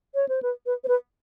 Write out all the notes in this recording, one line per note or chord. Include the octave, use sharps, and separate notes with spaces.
C#5
C5
B4
B4
C5
B4